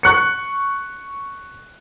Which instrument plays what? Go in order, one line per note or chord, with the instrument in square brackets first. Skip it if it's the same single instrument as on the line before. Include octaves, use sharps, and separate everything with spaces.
[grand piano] C#6 F#6 C#7